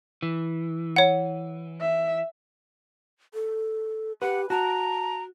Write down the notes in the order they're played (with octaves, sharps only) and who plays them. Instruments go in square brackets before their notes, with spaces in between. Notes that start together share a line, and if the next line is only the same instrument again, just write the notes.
[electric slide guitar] E3
[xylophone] C#5 F#5
[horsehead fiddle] E5
[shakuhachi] A4
[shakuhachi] G4 [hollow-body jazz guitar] B4 [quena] F#5
[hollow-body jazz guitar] F#4 [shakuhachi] A5 [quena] A#5